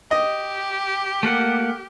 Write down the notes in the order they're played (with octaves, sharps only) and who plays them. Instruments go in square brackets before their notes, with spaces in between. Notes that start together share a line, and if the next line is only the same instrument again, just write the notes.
[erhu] G4 [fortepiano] D#5
[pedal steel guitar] A3 A#3 F#5